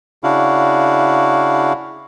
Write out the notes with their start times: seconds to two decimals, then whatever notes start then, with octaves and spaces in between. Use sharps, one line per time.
0.24 C#3 D4 E4 F#4 F5